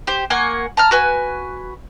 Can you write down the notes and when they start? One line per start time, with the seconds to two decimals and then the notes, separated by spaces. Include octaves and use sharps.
0.07 G4 C5
0.30 A#3 F#5 G#5 C#6
0.77 A5 A#5 F6
0.91 F#4 B4 G#5